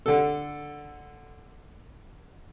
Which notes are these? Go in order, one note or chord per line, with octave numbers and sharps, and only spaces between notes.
D3 A4